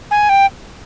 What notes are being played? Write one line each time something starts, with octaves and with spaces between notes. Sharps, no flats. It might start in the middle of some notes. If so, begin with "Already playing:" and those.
G#5
G5